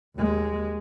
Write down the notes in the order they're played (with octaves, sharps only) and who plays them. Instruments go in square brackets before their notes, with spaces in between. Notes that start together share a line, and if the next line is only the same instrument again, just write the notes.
[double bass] D#2 G#3